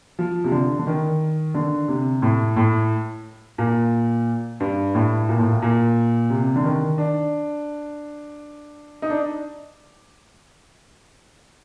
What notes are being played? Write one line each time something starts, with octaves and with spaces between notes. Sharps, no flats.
F3
C3
D3
D3
D#3
D3
C3
A2
A2
A#2
G2
A2
A#2
A2
A#2
A#2
C3
D3
D#3
D4
D#4
D4